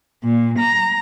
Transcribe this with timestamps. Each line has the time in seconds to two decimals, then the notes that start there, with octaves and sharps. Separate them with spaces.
0.23 A#2
0.59 A#5